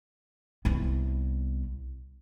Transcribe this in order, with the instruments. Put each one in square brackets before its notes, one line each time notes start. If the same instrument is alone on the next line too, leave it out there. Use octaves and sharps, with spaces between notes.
[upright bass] C2 B3